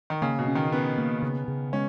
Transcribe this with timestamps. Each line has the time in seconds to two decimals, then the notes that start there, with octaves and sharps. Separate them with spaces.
0.10 D#3
0.22 C#3 A#3
0.39 B2
0.48 C#4
0.55 D#3
0.72 B3 C#4
0.98 A#3
1.23 C#3
1.48 C#3
1.73 G#3 C#4